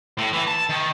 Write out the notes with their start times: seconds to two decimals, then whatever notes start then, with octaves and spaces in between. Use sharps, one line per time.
0.18 A2
0.33 E3
0.48 A5
0.69 D#3